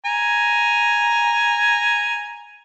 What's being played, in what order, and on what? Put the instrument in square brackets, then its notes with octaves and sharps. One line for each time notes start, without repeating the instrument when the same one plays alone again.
[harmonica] G#5 A#5